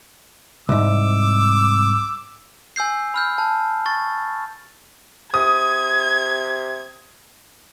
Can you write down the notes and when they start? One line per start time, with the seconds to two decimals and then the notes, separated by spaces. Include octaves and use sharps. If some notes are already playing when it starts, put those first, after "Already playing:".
0.69 C2 G#2 D6 E6
2.76 G#5 E6 G6 C7
3.14 B5 F6 G6
3.38 A5
3.86 C#6 A6
5.34 C3 D#6 G#6